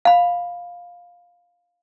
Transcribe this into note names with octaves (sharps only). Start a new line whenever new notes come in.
F5 B5